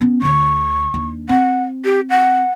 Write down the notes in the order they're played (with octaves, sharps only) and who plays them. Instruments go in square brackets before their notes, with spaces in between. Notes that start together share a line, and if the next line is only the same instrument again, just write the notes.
[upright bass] B3 C#4
[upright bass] D2 D3 [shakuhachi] C#6
[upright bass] D#2 D4
[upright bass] C4 [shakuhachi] F#5
[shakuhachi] G4
F#5